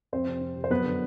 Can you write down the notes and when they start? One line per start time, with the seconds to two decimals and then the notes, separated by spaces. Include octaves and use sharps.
0.12 F2 C4 C5
0.27 C3
0.41 F2
0.56 C3
0.64 C5
0.70 F#2 B3 B4
0.85 D3